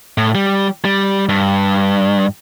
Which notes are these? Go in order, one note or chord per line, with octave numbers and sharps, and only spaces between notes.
A2
G3
G3
G2